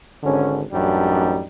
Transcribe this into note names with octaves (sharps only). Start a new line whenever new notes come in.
G#1 D3 C#4
A1 F#2 G3 D4 D#4